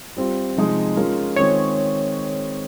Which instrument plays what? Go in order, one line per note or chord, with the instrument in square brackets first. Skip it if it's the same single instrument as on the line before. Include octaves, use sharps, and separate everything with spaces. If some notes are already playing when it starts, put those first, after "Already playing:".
[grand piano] G3 C4 F4
C3 F3 G#3 D#4 G#4
G#3 C#4 F4 A#4
[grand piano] D#3 G#3 C4 F4 G#4 [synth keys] C#5